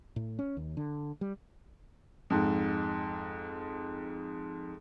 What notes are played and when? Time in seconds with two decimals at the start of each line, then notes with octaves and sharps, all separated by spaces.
0.16 A2
0.39 C#4
0.57 D#2
0.77 D3
1.21 G3
2.30 F2 G#2